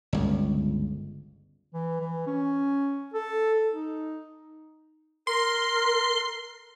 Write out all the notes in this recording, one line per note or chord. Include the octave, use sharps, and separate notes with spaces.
G1 C#2
E3
E3
C#4
A4
D#4
A#4 C6